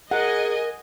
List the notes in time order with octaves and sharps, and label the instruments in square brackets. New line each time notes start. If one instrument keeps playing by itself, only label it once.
[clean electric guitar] G#4 A#5 [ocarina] A#4 [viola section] D#5 G#5 [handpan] F#5